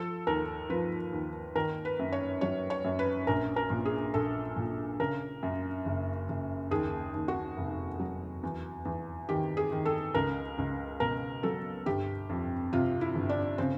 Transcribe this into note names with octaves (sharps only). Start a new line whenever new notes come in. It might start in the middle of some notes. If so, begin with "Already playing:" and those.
Already playing: F3 A4
D#2 A#4
F3 B4
D#2
D#3 A#4
B4
F#2
C#5
F#3 C#5
C#5
F#2
B4
A#1 A#4
A#4
A#2
G#4
A#1 A4
A#2
C#3 A#4
F#2
F#1
F#1
D#2 G#4
D#2
F#4
F1
F#3
E2
E2
D#3 G4
G#4
D#3
A4
C#2 A#4
C#2
B2 A#4
F#3 A4
G1 G4
F2
C3 F4
E4
G1
D4
C#3 C4